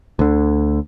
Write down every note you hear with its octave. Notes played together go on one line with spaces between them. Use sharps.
D2 D3